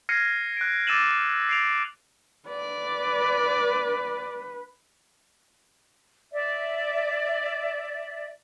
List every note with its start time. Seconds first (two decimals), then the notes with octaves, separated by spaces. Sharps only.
0.09 F6 G#6 A#6 C7 C#7 D#7
0.57 F#6 D7
0.87 D6 E6 A6 D#7 E7 F#7
1.49 C7 D7 F7
2.49 B4 D5
6.32 D5 E5